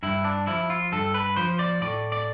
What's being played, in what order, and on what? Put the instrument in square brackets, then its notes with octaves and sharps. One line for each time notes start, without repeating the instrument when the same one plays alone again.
[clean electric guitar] G2 E4
D4
F3 E4
F4
G2 A4
B4
F3 C5
D5
A2 D5
D5